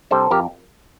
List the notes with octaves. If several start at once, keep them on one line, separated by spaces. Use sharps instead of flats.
C3 G3 D4 A4 C5
F2 G4 A#4